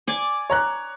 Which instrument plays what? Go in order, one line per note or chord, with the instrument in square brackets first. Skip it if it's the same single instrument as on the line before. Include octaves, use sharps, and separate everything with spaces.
[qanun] D5 G#5
[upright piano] C#5 A#5 F#6